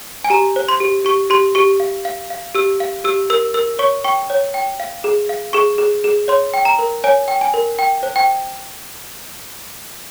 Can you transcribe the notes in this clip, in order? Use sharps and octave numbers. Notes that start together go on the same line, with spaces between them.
G#5
G4 A#5
C5
C6
G4
G4 C#6
G4 C6
G4 C#6
F5
F5
F5
G4 E6
F5
G4 E6
A#4 E6
A#4 E6
C#5 C#6
G5 C#6
C#5
G5
F5
G#4
F5
G#4 C#6
G#4
G#4
C#5 C6
G5
A#5
A#4
C#5 G#5
G5
G#5
A#4
G5
C5
G5